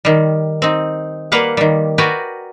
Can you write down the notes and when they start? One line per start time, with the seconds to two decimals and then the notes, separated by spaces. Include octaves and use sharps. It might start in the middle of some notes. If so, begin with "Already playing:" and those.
0.05 D#3 G3
0.62 C4 D#4
1.32 G3 A#3 B4 F5 F#5
1.57 D#3 G3
1.98 F#4 A#4 B4 D5 G5 G#5